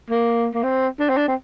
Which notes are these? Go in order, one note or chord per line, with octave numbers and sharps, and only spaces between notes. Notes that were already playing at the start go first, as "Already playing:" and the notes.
A#3
A#3
C4
D4
C4
D4
C4